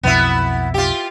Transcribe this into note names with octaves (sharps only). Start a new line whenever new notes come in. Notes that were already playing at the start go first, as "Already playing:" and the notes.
B1 F2 B2 B3 E4
F4 G4